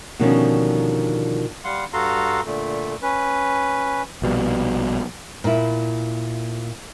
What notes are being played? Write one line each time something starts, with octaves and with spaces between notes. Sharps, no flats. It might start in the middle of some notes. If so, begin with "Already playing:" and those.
B2 D3 D#3 F3 G3 C#4
G3 F5 F#5 C6
G2 F#4 A4 F5 A#5 C6
A#2 D3 A3
C#4 B4
A#1 B2 G3
A#2 E4